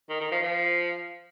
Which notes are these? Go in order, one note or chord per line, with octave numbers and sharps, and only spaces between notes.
D#3
D#3
F3
F3